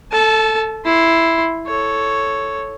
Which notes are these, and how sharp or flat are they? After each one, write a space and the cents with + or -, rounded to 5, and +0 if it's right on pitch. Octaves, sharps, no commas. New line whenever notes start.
A4 +10 A5 -25
E4 +0 C6 +0
A4 +0 C#5 +0